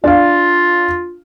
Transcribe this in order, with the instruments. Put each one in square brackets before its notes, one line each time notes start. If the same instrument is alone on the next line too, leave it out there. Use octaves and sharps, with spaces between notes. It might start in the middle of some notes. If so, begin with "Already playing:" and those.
[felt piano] D4 F5 [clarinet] F4